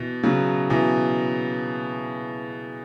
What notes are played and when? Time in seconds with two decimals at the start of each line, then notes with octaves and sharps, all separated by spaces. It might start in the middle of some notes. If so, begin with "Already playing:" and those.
Already playing: B2 E3
0.23 C#3 F#3
0.70 B2 E3